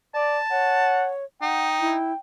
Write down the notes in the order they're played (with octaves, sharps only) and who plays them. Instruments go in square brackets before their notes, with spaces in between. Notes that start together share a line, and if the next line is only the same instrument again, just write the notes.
[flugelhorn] D5 [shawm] A5
[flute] C#5 [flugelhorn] F#5
[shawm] D#4 [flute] F#5 [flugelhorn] G5
[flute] E4